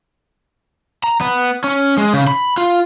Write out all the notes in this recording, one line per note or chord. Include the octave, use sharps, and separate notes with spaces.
A#5
B3
C#4
G#3
C#3
B5
F4